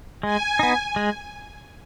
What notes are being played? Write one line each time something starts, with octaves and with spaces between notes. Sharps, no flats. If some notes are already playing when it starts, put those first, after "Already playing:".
G#3 G#5
B3 D#4
G#3